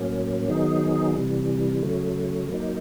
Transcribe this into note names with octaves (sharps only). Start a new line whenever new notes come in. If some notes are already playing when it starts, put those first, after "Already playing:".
Already playing: A2 F#3 A#3 C#4
D#3 F#3 B3 D#4 G#4
C3 E3 G3
C#3 F#3 A3
F#3 A#3 D#4